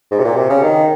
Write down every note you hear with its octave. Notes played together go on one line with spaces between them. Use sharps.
G#2
C3
A#2
C3
C#3
D#3